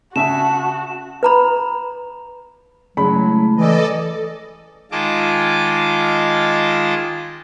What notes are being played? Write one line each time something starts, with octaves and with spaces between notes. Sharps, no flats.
C#3 F#4 E5 G#5 A5 E7
B4 A#5 B5
C#3 F#3 G#3 A3 E4 B5
E3 A4 D5 D#5
D#3 G#3 F4 D#5 A5 D6